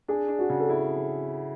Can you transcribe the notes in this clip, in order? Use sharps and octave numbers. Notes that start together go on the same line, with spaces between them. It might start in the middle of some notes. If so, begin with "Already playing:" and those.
D4 G#4
D4
F#4
C#3
A4
E4 G#4